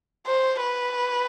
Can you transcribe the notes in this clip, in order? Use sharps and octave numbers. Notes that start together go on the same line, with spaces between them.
C5
B4